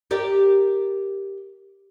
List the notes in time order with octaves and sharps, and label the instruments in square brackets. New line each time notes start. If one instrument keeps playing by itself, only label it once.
[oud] G4 A#4 D5